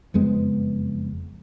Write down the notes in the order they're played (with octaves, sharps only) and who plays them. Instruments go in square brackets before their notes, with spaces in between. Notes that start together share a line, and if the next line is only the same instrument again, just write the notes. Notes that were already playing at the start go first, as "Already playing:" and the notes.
[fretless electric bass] F#1 F2 G#3 B3